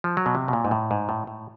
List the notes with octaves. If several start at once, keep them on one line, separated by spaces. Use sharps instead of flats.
F3
F#3
B2
C3
B2
A#2
G#2
A2
G#2
A2
A2